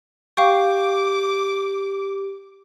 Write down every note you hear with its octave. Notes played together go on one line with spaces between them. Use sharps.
G4 F5 G5 C#6 D6